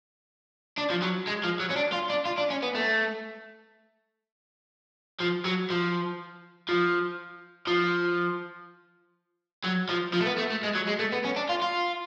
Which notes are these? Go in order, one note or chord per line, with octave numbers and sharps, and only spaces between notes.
D4
F3
F#3
G#3
F3
F#3
C#4
D4
F4
D4
F4
D4
C#4
B3
A3
F3
F#3
F3
F3
F3
F#3
F3
F3
A3
B3
A3
A3
G#3
F#3
G#3
A3
B3
C#4
D4
F4
F4